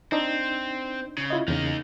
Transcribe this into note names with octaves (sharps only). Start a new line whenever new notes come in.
C4 D4 D#4
C#3
E4 F4 D#5
E2 C#3 A#3 D#4